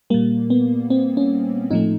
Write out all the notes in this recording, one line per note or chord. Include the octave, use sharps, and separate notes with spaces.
A#2 G3 A#3
B3
C4
C#4
A2 F3 A3 D#4